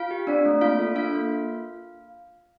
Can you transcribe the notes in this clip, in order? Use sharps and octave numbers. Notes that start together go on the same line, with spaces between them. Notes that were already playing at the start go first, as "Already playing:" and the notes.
Already playing: F4 F5
G4
C4 D4 D5
A3
A#3 F4 F5
A4
D4 F4 F5
A#3